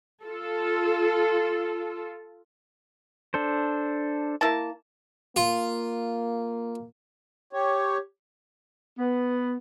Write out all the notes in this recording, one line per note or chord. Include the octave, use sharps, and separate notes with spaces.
F4 A4
D4 A4 C5
A#3 E4 A5
A#3 F4
G4 C#5
B3